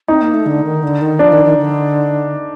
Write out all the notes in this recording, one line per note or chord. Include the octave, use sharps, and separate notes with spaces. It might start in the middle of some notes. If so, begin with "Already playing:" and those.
C4 D#4
A#3
A3
D3
D#3
D3
D#3
F3 D4
D#3
D#3
D3